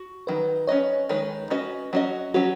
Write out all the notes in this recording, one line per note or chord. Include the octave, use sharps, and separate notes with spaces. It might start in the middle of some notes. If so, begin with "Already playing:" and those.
Already playing: F#4
D#3 F#3 B4
C#4 B4 C#5 D#5
D#3 G#3 D#4 B4 C#5
C#4 F#4 B4 D#5
F#3 C#4 F#4 D#5
F#3 C#4 F#4 B4